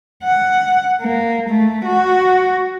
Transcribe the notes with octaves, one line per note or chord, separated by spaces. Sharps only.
F#5
A#3
A3
F#4